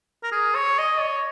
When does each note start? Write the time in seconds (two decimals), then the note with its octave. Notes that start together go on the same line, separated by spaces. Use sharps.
0.23 A#4
0.32 G#4
0.55 C#5
0.79 D#5
1.01 C#5